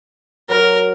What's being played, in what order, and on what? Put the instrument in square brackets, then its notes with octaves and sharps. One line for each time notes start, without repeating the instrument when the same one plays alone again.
[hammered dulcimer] F#3 [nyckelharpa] A#4